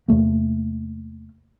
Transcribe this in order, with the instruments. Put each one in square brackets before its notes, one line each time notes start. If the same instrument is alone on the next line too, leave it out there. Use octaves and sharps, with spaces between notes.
[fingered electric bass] E2 C3 A3 A#3